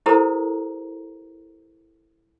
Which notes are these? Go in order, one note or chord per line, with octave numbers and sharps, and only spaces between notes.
E4 G4 A4 A#4 C5 A#5